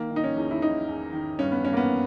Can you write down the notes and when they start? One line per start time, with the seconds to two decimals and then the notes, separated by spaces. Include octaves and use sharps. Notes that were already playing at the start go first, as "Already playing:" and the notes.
Already playing: D#3 A#3
0.11 D#3
0.16 D#4
0.24 C#4
0.36 E2
0.51 E4
0.62 D#3 D#4
0.88 E2
1.13 D#3
1.39 G2 C#4
1.52 B3
1.65 G2 C#4
1.73 A#3
1.77 B3